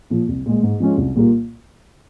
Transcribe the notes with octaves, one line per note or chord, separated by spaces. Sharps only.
A#2 F3
C2
A#2 G#3
G#2
F3 G#3 C#4 F4
C2
A#2 G3 A#3 F4